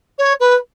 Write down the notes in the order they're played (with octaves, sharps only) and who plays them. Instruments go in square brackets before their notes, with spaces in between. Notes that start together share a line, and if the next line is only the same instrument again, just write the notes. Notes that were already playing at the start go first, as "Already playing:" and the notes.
[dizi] C#5
B4